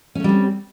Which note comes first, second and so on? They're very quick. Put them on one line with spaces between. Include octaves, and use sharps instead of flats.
C#4 A3 G3 C4